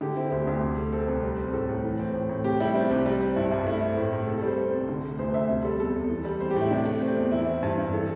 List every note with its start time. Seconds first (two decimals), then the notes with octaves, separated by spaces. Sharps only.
0.01 D3 G4
0.16 C4 E4
0.31 D2 G4
0.47 D2
0.62 C3
0.77 A3
0.92 C4 A4
1.08 C2
1.23 G3
1.38 C4
1.53 A2 A4
1.69 A2
1.84 E3
1.99 C4
2.14 A2
2.29 A2
2.44 C3 G4
2.60 G3 E4
2.75 C4 D4
2.91 C2
3.06 G3
3.20 C4
3.36 G2 E4
3.51 G2 D4
3.66 A3 E4
3.82 C4
3.97 A2
4.13 A2
4.27 C3 A4
4.37 A4
4.43 G3 C5
4.58 C4
4.73 C2
4.89 D3
5.04 A3
5.19 D2 C5
5.34 D2 E5
5.49 C3
5.64 G3 A4
5.80 E2 A4
5.95 E2
6.10 E3
6.25 G3
6.40 C4 C5
6.51 G4
6.56 A2 E4
6.71 C3 D4
6.86 A3
7.01 C4
7.17 E2
7.32 E3 E4
7.47 C4
7.63 G2
7.78 G2
7.93 E3 A4